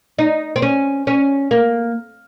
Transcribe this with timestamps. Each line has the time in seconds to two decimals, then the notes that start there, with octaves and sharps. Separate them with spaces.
0.19 D#4
0.56 C4
0.62 C#4
1.07 C#4
1.51 A#3